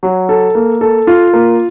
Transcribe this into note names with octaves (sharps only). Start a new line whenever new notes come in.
F#3
A4
A#3
A4
F4
A#3